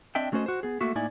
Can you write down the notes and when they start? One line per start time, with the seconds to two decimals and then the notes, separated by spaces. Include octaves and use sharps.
0.15 C4 D4 D#5 E5 G5
0.32 F#3 A3 C#4 F#4 C5 D#5
0.46 F#4 C5
0.63 B3 G#4
0.81 A3 A#3 F#4 E5
0.95 A2 A#3 D#4 E4 D5 G#5